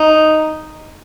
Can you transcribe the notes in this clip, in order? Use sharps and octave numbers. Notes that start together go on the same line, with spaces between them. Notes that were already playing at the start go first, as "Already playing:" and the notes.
Already playing: D#4